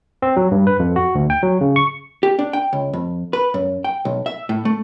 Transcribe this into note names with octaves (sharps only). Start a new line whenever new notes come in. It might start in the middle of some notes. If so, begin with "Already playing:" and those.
C4
F#3
G2
B4
F2
F#4
D2
G5
F#3
C#3
C#6
G4
D4
G5
C#2
F2
B4
F#2
G5
B1
E5
A2
A3